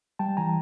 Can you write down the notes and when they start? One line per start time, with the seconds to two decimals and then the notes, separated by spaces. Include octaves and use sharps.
0.19 G3 G5 A5
0.37 E3 G#5 A#5